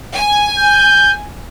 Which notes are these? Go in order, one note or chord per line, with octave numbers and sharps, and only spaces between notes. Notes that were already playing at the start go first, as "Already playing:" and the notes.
G#5
G6